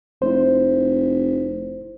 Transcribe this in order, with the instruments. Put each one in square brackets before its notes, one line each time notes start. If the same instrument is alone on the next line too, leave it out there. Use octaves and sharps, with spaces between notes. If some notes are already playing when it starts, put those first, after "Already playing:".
[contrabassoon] F1 [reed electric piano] E4 C5